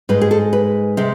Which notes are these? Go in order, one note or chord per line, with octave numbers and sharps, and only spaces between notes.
G#2 G#3 B4
G#4
A4
B4
C3 G#3